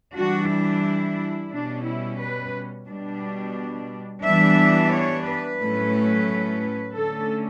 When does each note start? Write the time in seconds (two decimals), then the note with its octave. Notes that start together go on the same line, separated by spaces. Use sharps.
0.16 E3 G3 D4 F#4
0.50 E4
1.52 B2 G3 C#4 D4
1.85 E4
2.20 B4
2.88 B2 G3 D4
4.23 E3 G3 B3 D4 E5
4.92 C#5
5.25 B4
5.59 A2 F#3 A3 C#4
6.95 D3 A3 C#4 A4